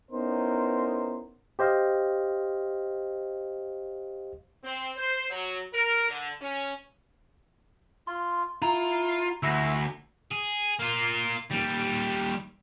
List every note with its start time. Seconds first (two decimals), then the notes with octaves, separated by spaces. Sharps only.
0.11 B3 C#4 D#4 E4 A#4 C5
1.59 G4 C5 D#5 F5
4.64 C4
4.96 C5
5.30 F#3
5.74 A#4
6.09 D3
6.41 C#4
8.07 F4 C6
8.62 E4 F4 A#5
9.43 D2 E4 F#4 E6 A#6 B6
10.31 G#4
10.79 A#3 F4
11.51 D#2 G3